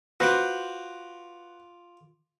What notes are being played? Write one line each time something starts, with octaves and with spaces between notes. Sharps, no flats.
F4 F#4 B4 C5 D6